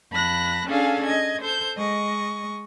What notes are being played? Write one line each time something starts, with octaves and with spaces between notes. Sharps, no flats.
F2 A5 B5 F#6 A#6
C#4 D4 G#4 A4 F5 G#5
D#5 G#6
A4 C5 G6
G#3 D#5 C#6